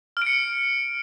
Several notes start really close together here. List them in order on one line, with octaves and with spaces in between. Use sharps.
F6 D7 C#7